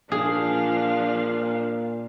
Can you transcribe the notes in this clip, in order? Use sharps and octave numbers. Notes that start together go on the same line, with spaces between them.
A#2 F3 D4 G#4 F5